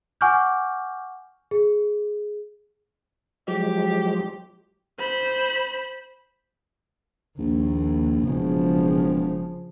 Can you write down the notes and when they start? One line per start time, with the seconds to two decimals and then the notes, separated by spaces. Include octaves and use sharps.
0.21 F#5 G#5 C#6 D6 F6 G6
1.51 G#4
3.48 F3 F#3 G#3 G4
4.99 C5 B5
7.39 A#1 D#2
8.27 E1 C#3 F3